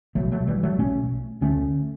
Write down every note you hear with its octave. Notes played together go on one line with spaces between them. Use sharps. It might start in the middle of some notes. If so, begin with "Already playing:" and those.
B1 B2 F#3 A3
F#3 A3
E3 G3
F#3 A3
B1 B2 A3 C#4
D2 D3 A3 C#4